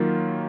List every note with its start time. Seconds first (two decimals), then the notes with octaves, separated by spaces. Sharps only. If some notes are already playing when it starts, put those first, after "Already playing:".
Already playing: D#3 F#3 A#3 F4